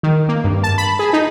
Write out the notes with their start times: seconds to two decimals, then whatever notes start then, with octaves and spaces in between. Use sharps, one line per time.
0.03 D#3
0.29 A#3
0.44 G2
0.63 A5
0.78 B5
0.99 G#4
1.13 D#4